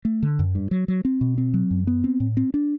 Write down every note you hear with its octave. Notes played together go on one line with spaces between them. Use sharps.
A3
D3
F#2
G2
F#3
F#3
C4
B2
C4
F#3
F#2
B3
C4
A2
C4
D4